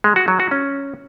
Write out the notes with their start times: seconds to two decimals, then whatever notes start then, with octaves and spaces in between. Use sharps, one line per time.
0.04 G#3
0.16 F#4
0.28 F#3
0.40 F#4
0.51 C#4